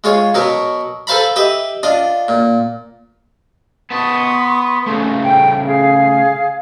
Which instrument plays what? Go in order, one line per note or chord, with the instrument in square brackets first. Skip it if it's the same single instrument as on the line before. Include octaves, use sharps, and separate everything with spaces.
[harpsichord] G#3 F4 C#5
B2 F#3 B3 A#4
A4 B4 C5 F5 A#5 B5
G4 B4 D#5 E5
D4 F4 D#5
A#2
[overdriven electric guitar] B3 A5 [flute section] C6 C#6 D#6
[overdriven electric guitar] C#3 A3
[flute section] G5
G#4 F5